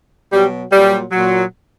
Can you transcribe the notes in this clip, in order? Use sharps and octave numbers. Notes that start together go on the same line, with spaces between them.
B2 F#3 G3
A#2 F#3 G3
A#2 F#3